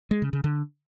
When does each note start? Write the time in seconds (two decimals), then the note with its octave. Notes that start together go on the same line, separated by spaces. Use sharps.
0.11 G#3
0.22 C#3
0.33 C#3
0.44 D3